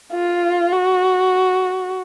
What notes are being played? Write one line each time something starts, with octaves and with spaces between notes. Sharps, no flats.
F4
F#4